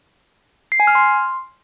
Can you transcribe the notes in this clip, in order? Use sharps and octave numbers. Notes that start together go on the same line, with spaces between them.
C7
G#5
F6
C6